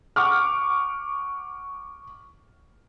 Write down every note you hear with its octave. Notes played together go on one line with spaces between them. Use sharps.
F#5 C#6 D6 F6